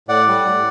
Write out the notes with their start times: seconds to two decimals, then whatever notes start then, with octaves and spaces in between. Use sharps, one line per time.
0.08 A2 D5 F#5
0.27 G3
0.45 A2